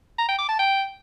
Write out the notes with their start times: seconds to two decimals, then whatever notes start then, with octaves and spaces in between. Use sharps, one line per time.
0.18 A#5
0.29 G5
0.39 D6
0.49 A5
0.59 G5